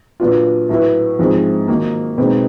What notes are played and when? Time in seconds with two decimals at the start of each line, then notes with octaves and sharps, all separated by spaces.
0.20 A#2 F#3 B3 D4 F4
0.69 A2 F#3 B3 E4
1.19 G#2 F3 G#3 C4
1.68 D#3 F#3 A#3 D#4
2.18 B2 G#3 C4 D#4